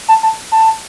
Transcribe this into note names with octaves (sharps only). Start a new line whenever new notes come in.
A5
A5
A5